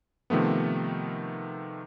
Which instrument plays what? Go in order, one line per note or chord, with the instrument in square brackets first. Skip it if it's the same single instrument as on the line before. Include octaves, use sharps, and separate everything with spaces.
[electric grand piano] C3 D#3 F3 A3 B3